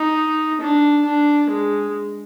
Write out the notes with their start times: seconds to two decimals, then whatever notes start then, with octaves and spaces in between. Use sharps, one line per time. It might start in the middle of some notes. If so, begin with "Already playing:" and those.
Already playing: D#4
0.61 D4
1.05 D4
1.51 G#3